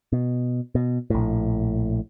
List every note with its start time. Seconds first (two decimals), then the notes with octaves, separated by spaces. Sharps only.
0.12 B2
0.75 B2
1.10 A#1 A2